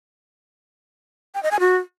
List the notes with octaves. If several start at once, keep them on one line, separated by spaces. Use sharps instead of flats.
G5
D#5
G#5
F#4